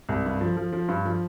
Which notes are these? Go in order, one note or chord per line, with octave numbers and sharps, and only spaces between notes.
C2
G2
F3
F3
F3
G2
F3